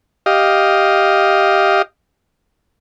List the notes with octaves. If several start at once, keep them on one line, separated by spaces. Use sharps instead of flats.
G4 D#5 F5